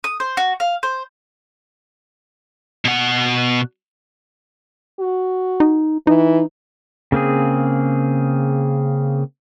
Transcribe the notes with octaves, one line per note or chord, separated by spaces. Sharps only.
D#6
C5
F#4
F5
C5
B2 F#5
F#4
D#4
E3 D#4
C#3 A#3 C4 G#4